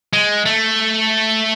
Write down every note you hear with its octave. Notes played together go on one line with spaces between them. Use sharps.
G#3
A3